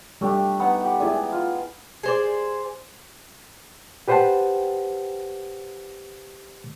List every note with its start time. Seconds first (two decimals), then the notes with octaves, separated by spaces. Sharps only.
0.21 G3 A3 D4 G4
0.60 B3 D#4 F#5
0.84 G4
1.00 E4 G#4 D5 G#5
1.33 F4
2.03 G#4 C5 D5
4.08 G4 B4 C5 F#5 G5 A5